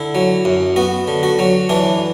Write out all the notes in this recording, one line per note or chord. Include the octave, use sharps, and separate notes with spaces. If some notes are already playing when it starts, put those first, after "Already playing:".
Already playing: D3 E4
F#3
F#2
B3 F#4
D3
F#4
F#3
E3 D4